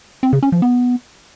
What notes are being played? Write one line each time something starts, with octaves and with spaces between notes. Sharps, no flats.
C4
C#3
C#4
F3
B3